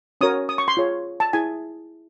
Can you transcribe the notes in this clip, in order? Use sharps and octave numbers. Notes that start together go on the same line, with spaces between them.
C#4 F#4 A#4 C#5 D#6
D#6
C#6
C6
F4 G#4 C#5
A5
E4 G#4 G#5